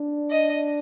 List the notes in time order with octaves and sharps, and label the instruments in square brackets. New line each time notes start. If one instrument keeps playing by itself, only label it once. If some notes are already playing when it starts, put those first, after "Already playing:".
Already playing: [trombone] D4
[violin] D#5